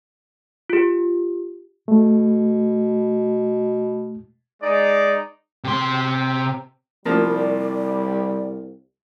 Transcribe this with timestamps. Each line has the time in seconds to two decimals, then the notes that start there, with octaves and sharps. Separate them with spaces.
0.70 F4 G4
1.88 B2 A3
4.62 G#3 D#4 D5
5.64 C3 C6
7.05 C2 F3 G3 A#3 D5